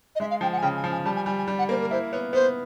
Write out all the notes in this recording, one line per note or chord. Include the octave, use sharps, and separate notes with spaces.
D#5
G#3 E5
F5
F3 G5
F#5
G#5
C#3 G5
G#5
F3
G#5
G3 A5
G#5
G3 G#5
G#5
G3
F#5
A#3 C5
A#4
E4 C5
B3 C#5
B3 C5